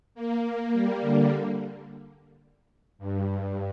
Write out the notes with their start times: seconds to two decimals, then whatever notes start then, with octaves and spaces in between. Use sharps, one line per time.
0.15 A#3
0.73 G3
1.01 D3
2.98 G2